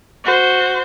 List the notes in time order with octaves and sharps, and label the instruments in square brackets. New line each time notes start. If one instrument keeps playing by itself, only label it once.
[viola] F#4 C5